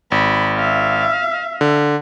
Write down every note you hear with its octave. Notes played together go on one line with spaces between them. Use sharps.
G#1 B5
E5 F5
D3